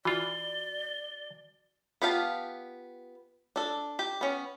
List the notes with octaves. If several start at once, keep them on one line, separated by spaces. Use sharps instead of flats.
E3 F4 F#4 D5 B5 G7
B3 F4 G4 F5 A5
D4 A4
G4
B3 C#4